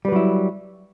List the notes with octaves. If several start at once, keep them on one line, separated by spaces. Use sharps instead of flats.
F#3 G3 E4 B4